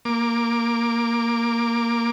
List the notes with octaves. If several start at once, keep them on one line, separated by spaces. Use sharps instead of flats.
A#3 D6